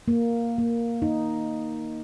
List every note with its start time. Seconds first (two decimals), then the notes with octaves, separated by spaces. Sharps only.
0.08 A#3
0.58 A#3
1.02 D#4